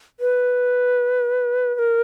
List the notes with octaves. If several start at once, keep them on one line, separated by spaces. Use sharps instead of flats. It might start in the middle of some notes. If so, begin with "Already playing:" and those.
B4
B4
A#4